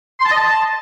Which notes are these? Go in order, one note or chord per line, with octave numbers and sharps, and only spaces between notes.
C6
A5
D#5
A5